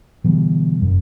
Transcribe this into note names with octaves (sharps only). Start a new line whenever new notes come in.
B2 D3 E3 G3
F#1 F#2